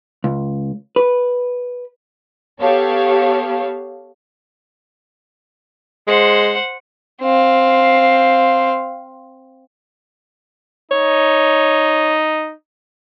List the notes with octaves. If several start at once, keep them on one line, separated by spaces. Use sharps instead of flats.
C#2
B4
B3 G4 A4 C#5 F5
G#3 C5 F#5
C4 F5
D#4 C#5